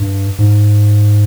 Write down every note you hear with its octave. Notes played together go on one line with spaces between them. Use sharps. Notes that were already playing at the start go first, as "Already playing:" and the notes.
Already playing: G2
G#2